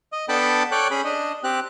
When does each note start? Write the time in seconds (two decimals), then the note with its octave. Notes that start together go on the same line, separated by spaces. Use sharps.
0.12 D#5
0.29 B3 D4 A4 G5 A5 B5
0.71 A4 C#5 D5 G5 F#6
0.91 C#4 G#4 B5
1.04 D4 D#5
1.44 C4 G4 F#6